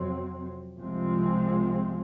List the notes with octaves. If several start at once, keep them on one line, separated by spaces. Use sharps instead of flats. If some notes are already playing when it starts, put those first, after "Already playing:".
Already playing: F2 C3 F#3 C4
C2 C3 F3 G#3 C4